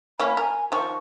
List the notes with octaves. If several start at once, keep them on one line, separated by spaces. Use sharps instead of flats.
A#3 C#4 E4 B5
A#4 G#5
D#3 F3 C#6